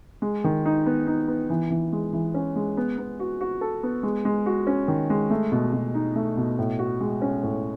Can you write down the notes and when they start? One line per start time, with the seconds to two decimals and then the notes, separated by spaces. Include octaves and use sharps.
0.22 G#3
0.44 D#3
0.66 D#4
0.86 B3
1.07 D#4
1.28 B3
1.50 E3
1.70 E3
1.92 G#3
2.13 E3
2.34 C#4
2.56 G#3
2.77 B3
2.98 B3
3.20 F#4
3.41 F#4
3.61 A4
3.83 B3
4.03 G#3
4.25 G#3
4.46 F#4
4.67 C#4
4.88 D#3
5.10 G#3
5.30 A3
5.52 B2
5.73 B2
5.95 D#4
6.15 A3
6.37 B2
6.59 A2
6.79 F#4
7.01 G#3
7.22 C#4
7.43 A2